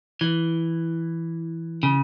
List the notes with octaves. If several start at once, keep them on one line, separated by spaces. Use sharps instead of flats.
E3
C#3